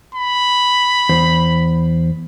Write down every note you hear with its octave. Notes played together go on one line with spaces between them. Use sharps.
B5
E2 C5